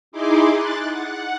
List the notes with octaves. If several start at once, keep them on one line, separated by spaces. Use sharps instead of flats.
D#4 E4 G#4 C6 D6
F#6 A6
F#5